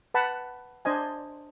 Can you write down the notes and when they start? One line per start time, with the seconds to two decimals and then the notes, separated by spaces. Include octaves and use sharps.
0.14 B4 F#5 A5 B5
0.85 D4 C5 D#5 G#5